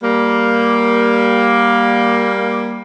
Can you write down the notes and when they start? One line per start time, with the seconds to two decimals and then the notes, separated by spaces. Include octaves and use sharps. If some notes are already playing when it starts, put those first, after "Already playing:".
0.03 G3 A#3